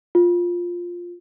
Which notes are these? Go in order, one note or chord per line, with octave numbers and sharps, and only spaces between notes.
F4